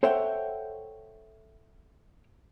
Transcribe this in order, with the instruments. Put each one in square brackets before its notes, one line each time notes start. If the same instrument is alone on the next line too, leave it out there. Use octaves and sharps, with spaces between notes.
[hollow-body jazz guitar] A4 C5 C#5 E5 F#5 G5